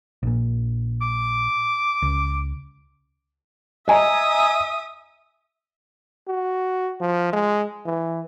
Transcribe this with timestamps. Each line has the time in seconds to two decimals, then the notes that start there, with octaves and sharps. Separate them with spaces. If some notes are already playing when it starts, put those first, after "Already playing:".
0.23 A#1 A#2
1.02 D6
2.02 C#2
3.88 D#5 E5 G#5 A#5 D#6
6.27 F#4
7.00 F3
7.33 G#3
7.85 E3